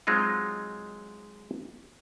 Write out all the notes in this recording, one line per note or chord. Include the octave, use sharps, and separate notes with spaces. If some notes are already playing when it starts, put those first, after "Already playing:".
F#3 G#3 C4 D#4 F4